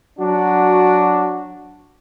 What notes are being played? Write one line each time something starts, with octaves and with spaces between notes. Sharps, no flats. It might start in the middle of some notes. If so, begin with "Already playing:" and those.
F#3 D4 F#4